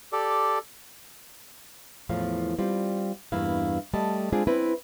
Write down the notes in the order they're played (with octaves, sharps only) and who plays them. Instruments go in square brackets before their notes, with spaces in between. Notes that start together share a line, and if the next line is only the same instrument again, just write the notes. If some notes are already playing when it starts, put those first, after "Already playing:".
[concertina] G4 A4 D5
[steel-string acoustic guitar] E2 A2 F3 F5
G3 C4 F4
E2 G2 A#3 E4 F5
G3 A3 D#5 A5
G#3 C4 D4 F4 G#4
C4 E4 B4